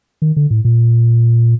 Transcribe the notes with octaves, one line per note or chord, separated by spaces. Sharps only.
D#3
D3
A2
A#2